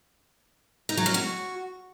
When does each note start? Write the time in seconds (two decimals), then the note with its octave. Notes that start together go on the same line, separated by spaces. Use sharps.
0.89 D#4
0.97 F#3
1.06 C#4
1.14 F#4